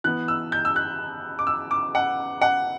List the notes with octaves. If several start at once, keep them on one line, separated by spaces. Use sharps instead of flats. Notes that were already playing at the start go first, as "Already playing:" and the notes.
E3 B3 F#6
E6
G6
E6
F#6
D6
E6
D6
F#5
F#5